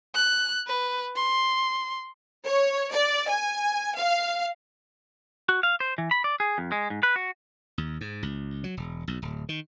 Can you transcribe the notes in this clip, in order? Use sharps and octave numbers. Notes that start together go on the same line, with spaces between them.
F#6
B4
C6
C#5
D5
G#5
F5
F#4
F5
C5
E3
B5
D5
G#4
F2
G#3
G#2
B4
F#4
D#2
G#2
C#2
F#3
E1
B1
D1
D#3